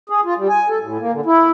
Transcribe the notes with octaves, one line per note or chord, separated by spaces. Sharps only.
G#4
F4
G3
G#5
A4
A2
A#3
D3
E4